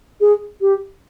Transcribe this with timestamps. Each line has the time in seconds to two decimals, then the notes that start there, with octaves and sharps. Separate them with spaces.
0.21 G#4
0.61 G4